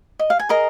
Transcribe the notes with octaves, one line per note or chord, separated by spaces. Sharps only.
D#5
F5
G#5
G#4 A#4 D#5 A#5